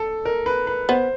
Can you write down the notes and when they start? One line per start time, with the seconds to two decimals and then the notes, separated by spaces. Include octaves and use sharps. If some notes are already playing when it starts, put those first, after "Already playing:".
Already playing: A4
0.25 A#4
0.46 B4
0.67 B4
0.89 B3 C5